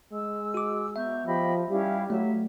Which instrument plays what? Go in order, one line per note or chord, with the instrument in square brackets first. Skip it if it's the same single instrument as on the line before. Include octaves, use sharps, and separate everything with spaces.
[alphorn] G#3 [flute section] E6
[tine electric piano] F#4 D6
[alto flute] B3 [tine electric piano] E5 [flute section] A#5 C#6 G6
[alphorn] F3 [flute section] G4 D#5 B5
[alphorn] G3 [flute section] C#4 E4 F5 [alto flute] G4
[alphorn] F#3 [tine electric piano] A3 [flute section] E5